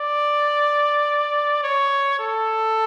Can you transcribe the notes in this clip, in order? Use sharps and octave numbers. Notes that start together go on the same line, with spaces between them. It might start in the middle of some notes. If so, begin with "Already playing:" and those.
Already playing: D5
C#5
A4